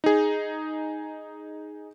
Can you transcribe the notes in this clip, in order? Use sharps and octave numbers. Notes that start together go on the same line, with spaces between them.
D#4 G#4